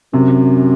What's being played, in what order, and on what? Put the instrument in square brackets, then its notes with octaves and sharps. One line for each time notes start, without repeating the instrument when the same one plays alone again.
[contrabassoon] F#2 [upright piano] C3